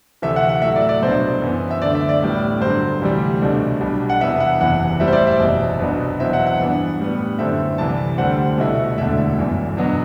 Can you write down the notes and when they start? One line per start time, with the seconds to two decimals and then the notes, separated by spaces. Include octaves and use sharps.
0.22 D2 C3 E3 A3 E5
0.36 F#5
0.49 F#5
0.62 A2 F#3 A3 E4 E5
0.76 D5
0.89 D5
1.02 C2 B2 F#3 B3 D4 C5
1.42 F#2 E3 B3
1.71 E5
1.82 D2 D3 A3 D4 D5
1.95 E5
2.09 D5
2.22 A1 A2 G3 B3
2.61 G2 D3 F#3 C4 C5
3.02 D2 C3 E3 G3
3.41 C2 B2 A3 D4
3.80 B1 B2 G3 D4
4.10 F#5
4.21 E2 C3 E3 B3 E5
4.40 F#5
4.61 F#1 E2 C3 E3 F#5
5.00 A2 G3 C4 E4 E5
5.08 C5
5.13 D5
5.27 E5
5.40 F#1 E2 B2
5.79 C2 B2 F#3 B3 D4
6.20 E2 B2 F#3 C4 E4 E5
6.33 F#5
6.47 F#5
6.60 G2 E3 B3 D4
7.00 A2 G3 B3
7.39 F#2 D3 A3 C4 E4 E5
7.78 C2 C3 E3 A5
8.18 D2 D3 G3 C4 F#5
8.58 C2 B2 A3 E4
8.98 E1 D2 D3 A3 E5
9.38 G1 F#2 E3
9.77 E2 B2 F#3 B3 D4